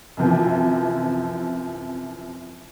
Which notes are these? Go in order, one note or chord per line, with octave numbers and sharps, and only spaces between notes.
F#2 C3 E3 F3